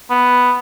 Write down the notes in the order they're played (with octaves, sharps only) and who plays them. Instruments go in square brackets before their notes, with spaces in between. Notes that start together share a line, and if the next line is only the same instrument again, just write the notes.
[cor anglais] B3